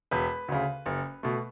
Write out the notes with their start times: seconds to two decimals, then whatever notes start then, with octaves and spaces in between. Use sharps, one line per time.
0.11 E1 B4
0.48 D2 C#3
0.86 F#1
1.23 B2 A3